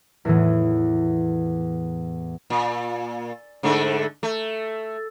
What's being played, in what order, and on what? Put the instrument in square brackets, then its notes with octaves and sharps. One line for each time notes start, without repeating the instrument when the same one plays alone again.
[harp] E2 A2 E3
[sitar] A#2
G#2 D3 A3
A3